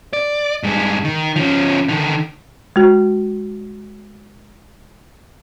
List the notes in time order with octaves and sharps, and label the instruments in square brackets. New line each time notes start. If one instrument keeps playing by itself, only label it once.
[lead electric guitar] D5
G2 G#3
D#3
F3 C#4
D3 D#3
[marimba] G#3 F#4